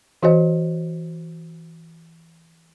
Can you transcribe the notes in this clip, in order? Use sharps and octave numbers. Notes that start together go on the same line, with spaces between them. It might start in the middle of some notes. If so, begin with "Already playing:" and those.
E3 F#4 C5 D#5